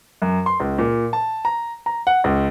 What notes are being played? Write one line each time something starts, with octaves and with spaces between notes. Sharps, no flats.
F#2
C6
C#2
A#2
A5
A#5
A#5
F#5
C#2